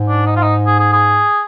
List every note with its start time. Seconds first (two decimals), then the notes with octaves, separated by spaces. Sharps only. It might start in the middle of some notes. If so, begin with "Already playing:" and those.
Already playing: G#2
0.08 D4
0.26 D#4
0.36 F4
0.42 D#4
0.66 G#4
0.79 G#4
0.93 G#4